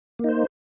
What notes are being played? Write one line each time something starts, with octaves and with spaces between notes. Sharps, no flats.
A#3 D#4 C5